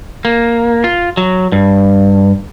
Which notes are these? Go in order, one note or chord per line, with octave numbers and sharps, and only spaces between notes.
A#3
F4
F#3
G2